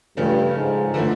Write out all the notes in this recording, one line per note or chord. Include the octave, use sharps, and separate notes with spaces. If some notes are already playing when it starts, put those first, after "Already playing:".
G2 C#3 F3 A3 C#4
G#2
D3 F3 A3 C4 E4